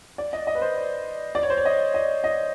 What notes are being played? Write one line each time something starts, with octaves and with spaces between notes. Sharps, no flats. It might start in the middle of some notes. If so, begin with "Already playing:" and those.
D5
D#5
D#5
B4
C5
D5
C#5
C5
C#5
D#5
D#5
D#5